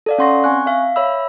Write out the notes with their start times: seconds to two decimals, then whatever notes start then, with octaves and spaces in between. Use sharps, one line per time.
0.06 A4 D5 F5
0.18 C#4 F#5 C6 C#6 A#6
0.44 C4 G#5 C#6 F#6
0.66 E5 F5
0.96 C#5 E5 B5 E6